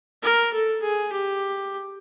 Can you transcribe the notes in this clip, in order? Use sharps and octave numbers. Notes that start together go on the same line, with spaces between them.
A#4
A4
G#4
G4